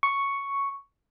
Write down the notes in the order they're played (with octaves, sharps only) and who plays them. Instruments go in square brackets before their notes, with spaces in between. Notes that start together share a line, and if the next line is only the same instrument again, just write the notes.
[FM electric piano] C#6